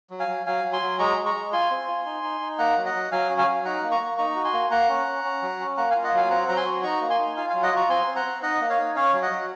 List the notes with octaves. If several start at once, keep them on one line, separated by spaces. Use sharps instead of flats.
F#3
F5 G#5
F#3
F#3 F5 G#5
F#3
G#5 C6
F#3
G#3 A#5 C#6
G#3
A#5 C#6
G#3
F4 G#5 C6
C4
F4
D#4
D#4
D#4
A#3 F#5 A#5
F#3
D#5 F#5
F#3
F#3 F5 G#5
C#4
F5 G#5
F#3
D#4 F#5 A#5
A#3
A#5 C#6
A#3
D#4 A#5 C#6
F#4
G#5 C6
A#3
A#3 F#5 A#5
C#4
C#4
C#4
F#3
C#4
A#3 F#5 A#5
F4 F5 G#5
D#5 F#5
F#3 F5 G#5
C4 F#5 A#5
F#3 A#5
G#5 C6
F#4
D#4 A#5 C#6
A#3
G#5 C6
D#4
F4 F5 G#5
F#3 F5 G#5
D#5 F#5
F4 A#5 C#6
C4 G#5 C6
C4
F#5 A#5
C4
D#4 D#5 F#5
A#3
C#5 F5
D#4
C#4 C#5 F5
F#3
D#5 F#5
F#3